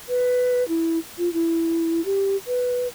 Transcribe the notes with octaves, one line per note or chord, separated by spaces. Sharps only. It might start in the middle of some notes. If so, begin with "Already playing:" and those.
B4
E4
F4
E4
G4
B4